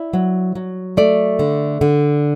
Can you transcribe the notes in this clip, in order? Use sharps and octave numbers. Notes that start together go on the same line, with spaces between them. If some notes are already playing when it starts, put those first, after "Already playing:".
Already playing: E4 D5
F#3
F#3
A3 D5
D3
D3